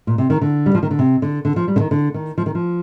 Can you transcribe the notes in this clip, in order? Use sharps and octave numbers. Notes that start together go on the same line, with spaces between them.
A#2
C3
D#3
D3
G3
F3
D#3
D3
C3
D3
D3
F3
G3
D3
D#3
D3
D#3
F3
D#3
F3